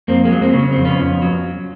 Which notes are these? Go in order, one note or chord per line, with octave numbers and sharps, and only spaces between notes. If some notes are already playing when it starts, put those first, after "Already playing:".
F2 A#3 C4
G#3 A#3
F#3
A#3 C4
C#3
C#4
F2 C4
B3 C#4
F2
F#3